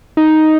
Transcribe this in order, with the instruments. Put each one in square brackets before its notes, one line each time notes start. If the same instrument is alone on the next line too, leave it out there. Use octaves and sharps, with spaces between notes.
[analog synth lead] D#4